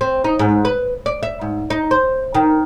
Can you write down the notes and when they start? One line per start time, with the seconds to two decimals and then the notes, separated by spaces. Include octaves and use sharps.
0.01 C4
0.24 D#4
0.39 G#2
0.65 B4
1.06 D5
1.23 E5
1.41 G#2
1.70 D#4
1.91 C5
2.35 D#3